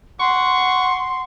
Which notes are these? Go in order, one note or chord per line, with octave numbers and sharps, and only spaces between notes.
F#5 C6 C#6